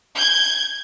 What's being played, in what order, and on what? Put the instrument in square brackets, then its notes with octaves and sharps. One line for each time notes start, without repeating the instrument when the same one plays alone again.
[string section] G6 G#6